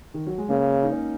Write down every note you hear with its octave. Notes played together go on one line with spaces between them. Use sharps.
D#3
F#3
G#3
C#3 A#3
D#4
C#4